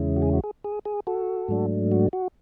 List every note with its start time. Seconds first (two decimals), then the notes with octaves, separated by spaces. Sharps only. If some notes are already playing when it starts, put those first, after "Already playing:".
Already playing: E2 C#3 G#3 C#4 E4
0.16 F#4
0.22 G#4
0.33 F#4
0.44 G#4
0.64 G#4
0.85 G#4
1.07 F#4 A4
1.48 G#2 F#3 A3 D4
1.92 F#4
2.13 F#4